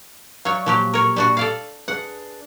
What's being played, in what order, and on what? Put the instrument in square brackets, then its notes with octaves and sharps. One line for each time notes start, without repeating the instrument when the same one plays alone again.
[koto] F#3 C#5 [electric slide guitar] D5 E5 F5
[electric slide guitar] A#2 [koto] F3 F#3 G4
[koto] A#4 C#5
G3 D4 F#4
A4 D5 F5
[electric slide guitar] D4 G#4 B4 [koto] F#5